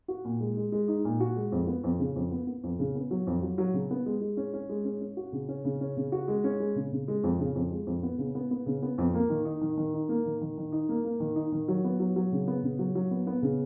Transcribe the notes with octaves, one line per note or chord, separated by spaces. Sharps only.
F#4
A#2
G#3
G#3
G#3
D#4
A#2
F#4
G#3
F2
B3
F2
C#3
F2
B3
B3
F2
C#3
B3
F#3
F2
F#3
F#3
C#3
B3
G#3
G#3
C#4
C#4
G#3
C#4
C#4
F#4
C#3
C#4
C#3
C#4
C#3
F#4
G#3
C#4
G#3
C#3
C#3
G#3
F2
C#3
F2
G#3
F2
B3
C#3
B3
B3
C#3
B3
F2
A#3
D#3
D#4
D#3
D#3
D#4
A#3
D#3
D#3
D#3
D#4
A#3
A#3
D#3
D#4
D#3
F#3
B3
F#3
F#3
C#3
B3
C#3
F#3
F#3
B3
B3
C#3